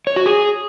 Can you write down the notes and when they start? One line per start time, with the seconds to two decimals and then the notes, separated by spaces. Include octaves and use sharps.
0.07 C#5
0.16 F#4
0.26 G#4